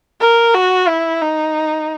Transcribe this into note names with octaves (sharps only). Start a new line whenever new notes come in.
A#4
F#4
E4
D#4